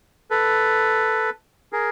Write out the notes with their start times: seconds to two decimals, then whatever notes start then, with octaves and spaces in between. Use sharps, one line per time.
0.31 A4 B4
1.73 G#4 A#4